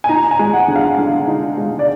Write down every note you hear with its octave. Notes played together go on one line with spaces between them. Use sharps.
G#5
D#4 A#5
G#5
G#3
F#5
D3
F5
D3
D#4
G#3
D5